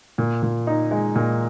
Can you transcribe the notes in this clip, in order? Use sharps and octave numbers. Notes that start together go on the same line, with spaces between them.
A#2
A#2
D#4
G#3
A#2